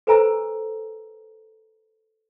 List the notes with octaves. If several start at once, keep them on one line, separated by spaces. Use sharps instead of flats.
A4 B4 C5 G#5 A#5 E6